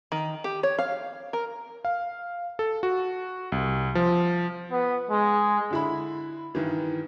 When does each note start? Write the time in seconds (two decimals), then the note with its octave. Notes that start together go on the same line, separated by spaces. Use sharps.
0.12 D#3
0.44 G4
0.63 C#5
0.79 F5
1.33 A#4
1.85 F5
2.59 A4
2.83 F#4
3.52 C2
3.95 F3
4.72 B3
5.10 G#3
5.71 D3 E4 B5
6.55 G2 D#3 E3